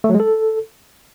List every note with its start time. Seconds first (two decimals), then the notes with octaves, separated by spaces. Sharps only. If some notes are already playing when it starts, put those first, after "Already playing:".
0.04 A3
0.09 F#3
0.14 G#3
0.20 A4